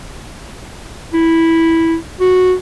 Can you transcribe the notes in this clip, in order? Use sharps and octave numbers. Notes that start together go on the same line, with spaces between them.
E4
F#4